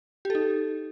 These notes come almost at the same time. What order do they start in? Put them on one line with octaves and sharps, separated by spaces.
G4 A4 D#4